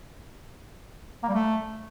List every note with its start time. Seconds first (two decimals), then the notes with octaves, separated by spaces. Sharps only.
1.23 A#3
1.28 G3
1.34 A3